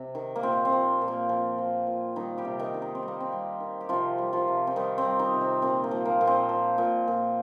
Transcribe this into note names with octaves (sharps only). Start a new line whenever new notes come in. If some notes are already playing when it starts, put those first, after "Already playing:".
Already playing: C3
D#3
A#3
A#2 C4
C4
F3
A#2
A#3
F3 C4
F3
A#2
D#3 G3 D#4
G3 G4
C3
D#3 D#4
D#3
D#4
C4
G3
A#3
C4
G3
D#3
G4
C3 F3 F4
G3
F3 F4
C3
C4
D#3 G3 D#4
C4
G3
D#3 D#4
C3
C4
A#2 C4
A#3
F3
A#3
A#2
C4
F3
A#2
A#2